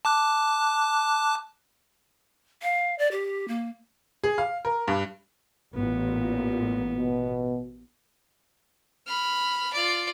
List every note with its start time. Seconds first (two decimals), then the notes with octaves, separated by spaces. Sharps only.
0.05 A5 D6 F#6
2.62 F5
2.99 D5
3.12 G4
3.48 A#3
4.24 G#4
4.38 F5
4.65 A#4
4.88 G2
5.75 A1 A#2 B3
6.97 B2
9.07 B5 F6
9.72 F4 D5